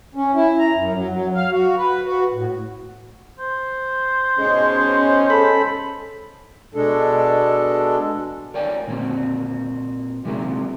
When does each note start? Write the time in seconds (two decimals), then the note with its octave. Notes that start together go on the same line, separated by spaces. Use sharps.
0.15 C#4
0.34 E4
0.59 A#5
0.75 F#2
0.94 F#3
1.11 F#3
1.35 F5
1.51 F#4
1.77 B4
2.05 F#4
2.33 A2
3.39 C5
4.39 G#2 B2 G#3 C#4
5.30 A4 B5
6.75 B2 G#3 D4 A4
8.54 A#4 C#5 D5 G5 G#5
8.87 A#2 A#3 C4 F#4
10.25 C3 F#3 G#3 A#3 E4 G4